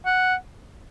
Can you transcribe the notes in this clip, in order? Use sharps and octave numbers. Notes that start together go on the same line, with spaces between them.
F#5